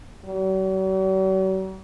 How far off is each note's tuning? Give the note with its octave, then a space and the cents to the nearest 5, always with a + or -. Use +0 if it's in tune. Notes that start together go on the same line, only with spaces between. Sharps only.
F#3 +45